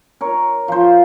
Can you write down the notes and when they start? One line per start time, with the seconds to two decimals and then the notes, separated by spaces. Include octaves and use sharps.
0.21 A#4 C#5
0.68 F3 C5